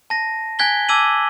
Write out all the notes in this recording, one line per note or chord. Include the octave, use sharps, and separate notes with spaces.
A5 A#6
G#5 F#6 G#6 B6 G7
A5 D6 E6 G#6 D#7 F#7